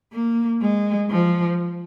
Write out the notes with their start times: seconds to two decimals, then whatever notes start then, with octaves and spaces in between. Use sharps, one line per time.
0.13 A#3
0.61 G#3
1.10 F3